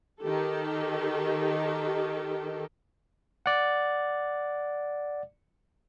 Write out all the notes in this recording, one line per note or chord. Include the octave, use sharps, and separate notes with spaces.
D#3 G4 A4
D5 F#5